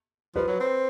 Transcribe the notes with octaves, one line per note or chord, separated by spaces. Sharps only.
F3 B4
F#3
C4